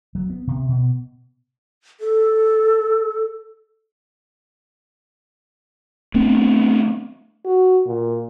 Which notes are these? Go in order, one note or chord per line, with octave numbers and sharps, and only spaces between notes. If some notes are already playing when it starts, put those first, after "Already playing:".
F#3
B3
C3
B2
A4
A3 B3 C4 D4
F#4
A#2